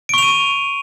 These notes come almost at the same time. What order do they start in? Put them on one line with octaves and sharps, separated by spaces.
D7 C#6 F7 D#7